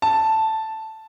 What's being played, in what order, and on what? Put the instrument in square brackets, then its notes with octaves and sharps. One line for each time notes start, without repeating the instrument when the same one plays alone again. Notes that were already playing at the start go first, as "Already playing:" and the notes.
[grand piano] A5